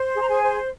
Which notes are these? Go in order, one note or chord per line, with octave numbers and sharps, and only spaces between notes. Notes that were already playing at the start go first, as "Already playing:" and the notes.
Already playing: C5
G#4
A#5
G#4 G#5
C5